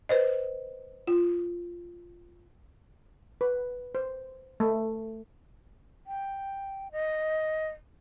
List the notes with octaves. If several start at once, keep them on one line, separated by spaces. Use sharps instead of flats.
B4 C5 D#5
F4
B4
C5
A3
G5
D#5